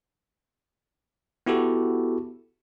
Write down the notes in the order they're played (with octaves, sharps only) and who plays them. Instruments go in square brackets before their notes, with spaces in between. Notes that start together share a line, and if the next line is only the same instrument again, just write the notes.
[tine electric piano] B3 E4 F#4 G4 A4